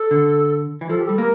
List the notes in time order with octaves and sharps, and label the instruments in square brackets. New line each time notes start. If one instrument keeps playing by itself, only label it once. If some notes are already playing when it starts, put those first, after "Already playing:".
Already playing: [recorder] A4
[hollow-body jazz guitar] D3
E3
[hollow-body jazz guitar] F3 [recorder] A4
[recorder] G4
[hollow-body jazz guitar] G3 [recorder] A4
[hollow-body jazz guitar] A#3 [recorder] A#4